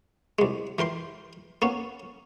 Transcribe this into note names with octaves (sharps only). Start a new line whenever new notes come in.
C2 G#3
E3 A#4 G5 C6
A#3 B3 C#4